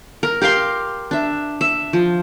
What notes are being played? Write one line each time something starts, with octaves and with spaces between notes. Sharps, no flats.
A#4
G4 A#4 F5 C6
D4 E5
E5
F3